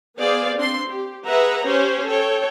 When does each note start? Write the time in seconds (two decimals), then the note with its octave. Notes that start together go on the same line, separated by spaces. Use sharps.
0.18 B3 G#4 C5 D5 F5
0.57 C4 D4 C6
0.89 G4
1.26 G#4 B4 E5 F#5 A#5
1.65 C#4 G4 C5 C#5
2.07 A4 C#5 G5